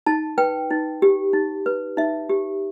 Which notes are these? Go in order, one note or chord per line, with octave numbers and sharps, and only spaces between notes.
D#4 A5
B4 G5
D#4
G4
D#4
B4
D#4 E5
G4